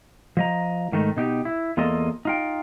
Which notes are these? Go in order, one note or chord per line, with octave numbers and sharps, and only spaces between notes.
F3 D#5 A#5
G#2 D#3 A3 D#4
B2 D#4 G4
E4
E2 A#3 F4 G#4 A4 D#5
D#4 F4 G5